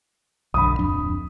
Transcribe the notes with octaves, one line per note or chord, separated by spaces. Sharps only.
B1 F#2 D3 B5 D#6
D1 F2 D4